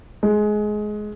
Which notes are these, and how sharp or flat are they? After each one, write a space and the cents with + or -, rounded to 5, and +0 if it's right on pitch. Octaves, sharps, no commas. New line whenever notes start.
G#3 +20